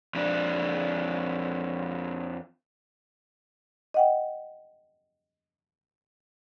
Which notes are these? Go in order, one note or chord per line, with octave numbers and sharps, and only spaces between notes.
F2 D4
D#5 F#5 G5